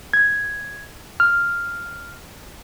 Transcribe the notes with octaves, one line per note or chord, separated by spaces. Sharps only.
G#6
F6